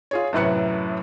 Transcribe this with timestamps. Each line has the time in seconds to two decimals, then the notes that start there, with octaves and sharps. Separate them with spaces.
0.11 F4 G#4 C#5
0.33 F#2 A2 C3 B4 F#6 C#7